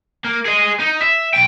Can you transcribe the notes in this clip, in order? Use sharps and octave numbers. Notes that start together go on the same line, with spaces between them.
A#3
G#4 D#5
D#4
E5
B1 G5